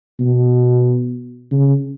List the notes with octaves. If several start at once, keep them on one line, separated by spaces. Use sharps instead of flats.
B2
C#3